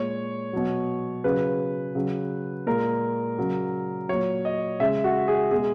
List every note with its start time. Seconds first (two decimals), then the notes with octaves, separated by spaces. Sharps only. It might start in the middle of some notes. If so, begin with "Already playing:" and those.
Already playing: A#2 G#3 C#5
0.53 B2 F#3
1.24 C#3 F#3 B4
1.95 C#3 F#3
2.67 A#2 G#3 A#4
3.38 C#3 F#3
4.09 A#2 F#3 C#5
4.45 D#5
4.80 C#3 G#3 E5
5.04 F#4
5.28 G#4
5.51 B2 G#3 G#4